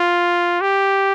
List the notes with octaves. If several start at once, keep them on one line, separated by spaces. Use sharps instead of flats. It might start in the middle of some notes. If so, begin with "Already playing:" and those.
Already playing: F4
G4